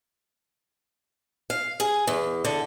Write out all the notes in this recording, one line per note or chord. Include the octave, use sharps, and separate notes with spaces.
F5
G#4
E2
D3